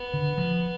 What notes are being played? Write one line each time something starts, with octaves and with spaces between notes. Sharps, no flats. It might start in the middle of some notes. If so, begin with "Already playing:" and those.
Already playing: B3
D3
F3